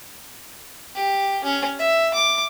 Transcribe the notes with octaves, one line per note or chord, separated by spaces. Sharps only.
G4
C#4
E5
D6